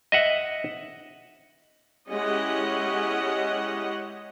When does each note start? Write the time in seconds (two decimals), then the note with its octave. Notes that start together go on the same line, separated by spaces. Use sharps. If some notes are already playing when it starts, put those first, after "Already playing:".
0.12 D#5 E5 F#5
2.09 G#3 C#4 E4 G4 D#5 F#5